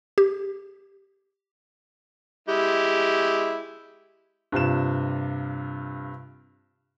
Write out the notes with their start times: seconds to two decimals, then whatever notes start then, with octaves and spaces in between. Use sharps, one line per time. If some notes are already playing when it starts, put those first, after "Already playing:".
0.18 G4
2.49 G#3 E4 G4
4.52 G2 C3 F4 E7